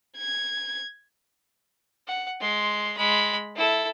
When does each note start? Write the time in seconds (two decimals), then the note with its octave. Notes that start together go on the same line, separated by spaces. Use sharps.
0.18 G#6
2.07 F#5
2.41 G#3 C6
2.97 G#3 B5
3.56 E4 A4